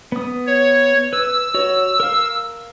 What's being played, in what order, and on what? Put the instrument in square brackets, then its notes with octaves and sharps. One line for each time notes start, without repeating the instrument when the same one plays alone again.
[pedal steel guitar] B3 D#6
[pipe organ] C#5
[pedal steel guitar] B4 [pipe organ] E6
[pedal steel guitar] F#4 C#5
A#4 F5